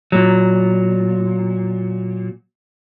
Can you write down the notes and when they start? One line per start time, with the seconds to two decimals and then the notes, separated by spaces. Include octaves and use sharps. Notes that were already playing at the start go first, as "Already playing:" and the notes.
0.12 A#2 F#3